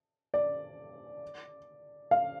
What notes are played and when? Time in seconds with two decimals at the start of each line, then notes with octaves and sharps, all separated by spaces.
0.34 D5
2.11 F5